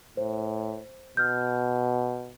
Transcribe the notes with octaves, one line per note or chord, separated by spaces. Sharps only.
A2 C5
B2 F6 G6